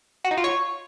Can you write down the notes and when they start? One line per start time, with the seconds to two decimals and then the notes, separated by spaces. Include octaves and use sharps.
0.24 F#4
0.31 D#4
0.37 F4
0.44 C#5